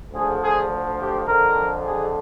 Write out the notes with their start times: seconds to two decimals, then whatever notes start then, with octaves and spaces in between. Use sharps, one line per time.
0.11 D2 D3 F3 G#4
0.41 G#4
0.98 G4
1.26 F2 D3 F3 A#4
1.85 G#4